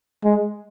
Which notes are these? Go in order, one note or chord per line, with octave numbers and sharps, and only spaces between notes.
G#3